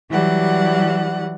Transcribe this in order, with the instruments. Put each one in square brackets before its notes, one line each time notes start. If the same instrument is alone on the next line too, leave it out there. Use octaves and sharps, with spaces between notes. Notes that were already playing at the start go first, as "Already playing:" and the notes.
[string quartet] E3 F#3 G3 D5 F#5